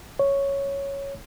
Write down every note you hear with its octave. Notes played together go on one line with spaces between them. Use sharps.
C#5